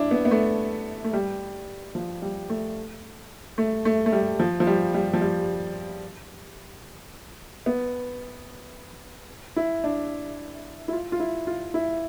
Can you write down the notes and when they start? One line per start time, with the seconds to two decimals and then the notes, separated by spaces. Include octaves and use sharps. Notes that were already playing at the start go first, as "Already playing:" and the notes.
Already playing: D4 E4
0.11 B3
0.25 B3
0.31 A3
1.04 A3
1.13 G3
1.95 F3
2.22 G3
2.50 A3
3.58 A3
3.85 A3
4.06 A3
4.12 G3
4.39 F3
4.60 F3
4.67 G3
4.94 G3
5.13 F3
5.21 G3
7.66 B3
9.56 E4
9.84 D4
10.88 E4
10.93 F4
11.12 F4
11.20 E4
11.47 F4
11.74 E4